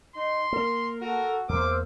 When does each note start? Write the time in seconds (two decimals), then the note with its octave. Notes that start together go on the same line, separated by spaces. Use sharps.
0.16 D#4 C6
0.53 A#3 A#4
1.01 F#4 A4 A#4
1.49 E2 A#3 C5 D6 E6 F6